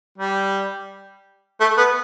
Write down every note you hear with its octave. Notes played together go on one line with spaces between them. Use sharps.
G3
A3
B3